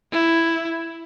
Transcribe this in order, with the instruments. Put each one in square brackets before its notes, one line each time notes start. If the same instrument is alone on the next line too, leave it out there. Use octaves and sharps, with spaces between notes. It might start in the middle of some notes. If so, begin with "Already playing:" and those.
[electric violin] E4